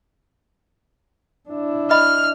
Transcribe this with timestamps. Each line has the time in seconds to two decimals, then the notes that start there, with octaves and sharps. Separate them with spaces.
1.50 D4 E4
1.91 D#5 B5 F6